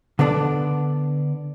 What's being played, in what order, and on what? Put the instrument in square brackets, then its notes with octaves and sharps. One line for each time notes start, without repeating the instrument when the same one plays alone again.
[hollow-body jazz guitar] D3 B3 D4 D5